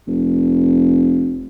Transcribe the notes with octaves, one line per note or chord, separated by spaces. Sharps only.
F1